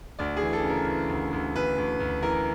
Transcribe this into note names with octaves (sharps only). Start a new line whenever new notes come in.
D2 D5
E3 G#4
A4
C#3
A#4
E3
D2
D2
D2 B4
D2
D2
E3 A#4